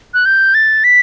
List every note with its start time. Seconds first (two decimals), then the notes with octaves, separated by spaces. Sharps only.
0.14 F#6
0.26 G6
0.54 A6
0.84 B6